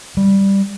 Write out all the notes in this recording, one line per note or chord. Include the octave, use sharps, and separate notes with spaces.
G3